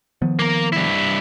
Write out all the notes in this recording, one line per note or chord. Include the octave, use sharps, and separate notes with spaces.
D#3 F3 B3
A#3 A#4
G2 E4